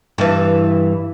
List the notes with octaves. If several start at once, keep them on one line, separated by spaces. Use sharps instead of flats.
G2 E3